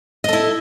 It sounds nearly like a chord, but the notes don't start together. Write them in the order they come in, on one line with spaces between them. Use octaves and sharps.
D#5 A4 E4